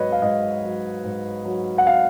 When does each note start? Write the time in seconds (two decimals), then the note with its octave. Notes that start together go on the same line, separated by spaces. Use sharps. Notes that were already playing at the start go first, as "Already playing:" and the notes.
Already playing: G#2 F#3 B4 C#5 D#5
0.12 F5
0.22 G#2 D#5
0.63 F#3
1.04 G#2
1.45 F#3
1.78 F#5
1.87 F5